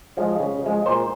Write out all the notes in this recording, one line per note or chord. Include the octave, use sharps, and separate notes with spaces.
F3 G#3
C#3
F3 G#3
A#2 C5